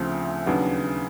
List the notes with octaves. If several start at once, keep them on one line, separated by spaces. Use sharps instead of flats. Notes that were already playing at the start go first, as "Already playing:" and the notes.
Already playing: D2 C#3 F3 A3 C4
D#2 C#3 F#3 B3 D4